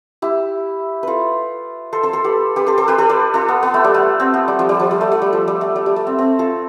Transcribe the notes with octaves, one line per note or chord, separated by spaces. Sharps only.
E4 G4
F4 A4 B4
A4 C5
A4 C5
A4 C5
G4 B4
G4 B4
A4 C5
A4 C5
G4 B4
A4 C5
B4 D5
F4 A4
B3
B3
A3
G3
A3
C4
B3
G3
F3
G3
F3
G3
A3
A3
G3
F3
G3
A3
G3
G3
A3
C4
C4
F4 A4